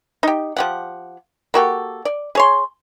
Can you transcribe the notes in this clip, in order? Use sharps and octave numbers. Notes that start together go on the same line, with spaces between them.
D#4 G4
F3 G4 F#5
A#3 F#4 G4 A4
D5
G#4 C#5 C6